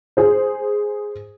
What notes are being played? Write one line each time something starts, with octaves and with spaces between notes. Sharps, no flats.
G#4 C5